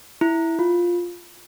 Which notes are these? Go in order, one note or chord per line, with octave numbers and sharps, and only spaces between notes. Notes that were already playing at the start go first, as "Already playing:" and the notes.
E4
F4